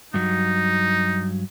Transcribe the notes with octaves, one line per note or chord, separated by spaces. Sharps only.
G2 F#3 D#4